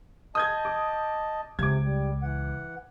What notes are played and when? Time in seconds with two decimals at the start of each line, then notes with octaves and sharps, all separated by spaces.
0.35 D#5 A5 D#6 G6 G#6
0.65 D6
1.59 C#2 C3 D6 G#6
1.84 G3
2.22 E3 F#5